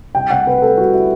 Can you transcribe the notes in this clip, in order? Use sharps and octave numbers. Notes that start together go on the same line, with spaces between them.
C2 G5
C2 F#5
C3 B4
G3 A4
C2 F#4
E4